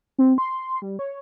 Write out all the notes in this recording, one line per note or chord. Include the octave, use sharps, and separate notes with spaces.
C4
C6
G3
C#5